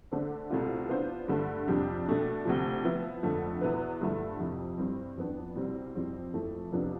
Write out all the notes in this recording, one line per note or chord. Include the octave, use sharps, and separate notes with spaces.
D3 A3 D4 A4 C5
C2 B2 A3 C4 F4
E3 B3 D4 F4 C5
G2 D3 A3
F2 C3 G3 D4 G4
B2 A3 D4
D2 C3 F3
F3 B3 E4
F2 D3 A3
E2 B2 B3 E4 B4
G2 D3 F3 A3 E4
F2 C3 E3
G2 E3 G3 C4
F2 E3 B3 D4
C2 B2 G3 C4
F2 E3 G3 C4
F2 E3 A3
F2 C3 F3 B3 D4